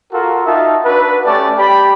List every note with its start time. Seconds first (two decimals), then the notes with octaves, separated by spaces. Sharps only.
0.12 F4 F#4 A4 A#4
0.46 D#4 F#4 E5 F5 A5
0.84 D4 F#4 B4
1.25 A3 C#4 G4 D5 A5
1.58 G4 D5 G5 B5